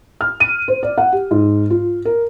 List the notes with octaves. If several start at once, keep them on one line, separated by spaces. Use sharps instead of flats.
F6
D#7
C5
D5
F#5
G4
G#2
F4
A#4